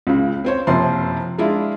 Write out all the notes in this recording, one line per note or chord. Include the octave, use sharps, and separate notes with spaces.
C#2 C#3
C4 C5 C#5
F#1 C3 F3 C6
G#3 D4 E4 F4